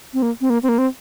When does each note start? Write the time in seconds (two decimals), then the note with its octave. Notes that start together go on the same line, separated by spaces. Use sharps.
0.14 C4
0.22 A#3
0.41 C4
0.50 A#3
0.63 C4
0.69 A#3
0.78 C4